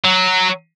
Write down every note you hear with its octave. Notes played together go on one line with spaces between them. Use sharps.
F#3